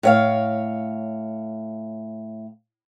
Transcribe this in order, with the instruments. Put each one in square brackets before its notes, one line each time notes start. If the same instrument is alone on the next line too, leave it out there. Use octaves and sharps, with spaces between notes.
[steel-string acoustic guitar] A2 C#5 F5